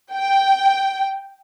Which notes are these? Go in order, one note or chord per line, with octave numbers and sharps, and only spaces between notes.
G5